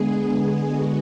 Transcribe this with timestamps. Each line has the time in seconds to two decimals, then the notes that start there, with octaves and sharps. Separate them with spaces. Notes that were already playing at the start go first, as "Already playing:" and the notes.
Already playing: D3 G#3 B3 G#4
0.68 F#4